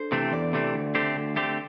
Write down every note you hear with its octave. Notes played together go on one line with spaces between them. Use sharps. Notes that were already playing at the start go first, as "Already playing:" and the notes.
Already playing: D4 A4 C5
C3 E3 A3 C4
E2 D5
C3 E3 A3 C4
D2
D3 A3 C4 G4
D2
D3 A3 C4 G4